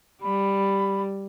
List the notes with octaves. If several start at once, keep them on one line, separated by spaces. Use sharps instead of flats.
G3 B5